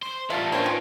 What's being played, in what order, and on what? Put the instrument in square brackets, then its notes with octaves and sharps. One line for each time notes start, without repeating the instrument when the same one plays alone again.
[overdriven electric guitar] C5 [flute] C6
[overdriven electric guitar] E2 G3 [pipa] F#3 A3 E5 [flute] F4 [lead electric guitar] B4 A5
[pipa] A#3 C4 C#5 [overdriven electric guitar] D4 F4 [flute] C5
[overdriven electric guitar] D#3 [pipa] C#4 F4